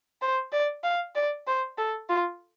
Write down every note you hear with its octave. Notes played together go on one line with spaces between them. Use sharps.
C5
D5
F5
D5
C5
A4
F4